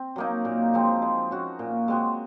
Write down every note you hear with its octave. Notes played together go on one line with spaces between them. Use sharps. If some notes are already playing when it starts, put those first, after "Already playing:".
Already playing: C4
F#3 A#3 D#4
A#2
F3 G#3 C4
G#3
C#4 F#4
A#2
G#3 C4 F#4